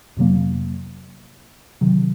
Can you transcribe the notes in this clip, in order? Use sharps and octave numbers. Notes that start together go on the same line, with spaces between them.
F2 C3 F#3 A#3
C3 D#3 F#3